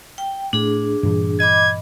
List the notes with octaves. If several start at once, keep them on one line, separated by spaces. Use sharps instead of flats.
G5
A2 D4 G#4
G2 A#2 E3
D#5 B5 D6 G#6